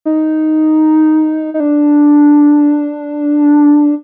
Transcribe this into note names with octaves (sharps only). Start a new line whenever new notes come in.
D#4
D#4
D4